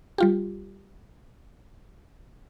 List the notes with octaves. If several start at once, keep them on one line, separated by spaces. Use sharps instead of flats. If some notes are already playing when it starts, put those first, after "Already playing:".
G3 F4 G4